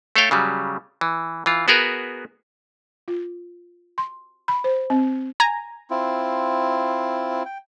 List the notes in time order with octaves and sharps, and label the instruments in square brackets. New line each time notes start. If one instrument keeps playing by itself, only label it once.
[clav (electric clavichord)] A3 A4 C#5 F5 G5
C#3 F#3 G3
E3
E3 F4
B3 F#4 G#4 A#4 B4
[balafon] F4
C6
B5
C5
C4
[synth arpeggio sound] G#5 A#5
[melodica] C4 E4 F4
G5